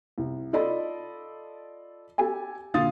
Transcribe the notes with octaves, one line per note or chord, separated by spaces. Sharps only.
C2
F4 A4 D5 D#5 B5
G4 A4 G#5
A#2 D3 F4 F5 D#6 A6